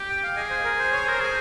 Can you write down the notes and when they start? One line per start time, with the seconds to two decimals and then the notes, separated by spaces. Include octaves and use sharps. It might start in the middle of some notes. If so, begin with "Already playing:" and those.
Already playing: G4
0.10 G5
0.23 F5
0.36 G#4 D#5
0.50 C5
0.64 A#4
0.79 C5
0.92 C#5
1.05 A#4 C5
1.20 G#4